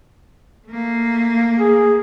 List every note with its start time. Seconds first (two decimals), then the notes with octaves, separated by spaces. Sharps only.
0.68 A3 A#3
1.59 G#4